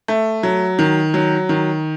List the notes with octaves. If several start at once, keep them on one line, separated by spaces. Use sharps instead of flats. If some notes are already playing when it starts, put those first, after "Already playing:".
A3
F#3
D#3
F#3
D#3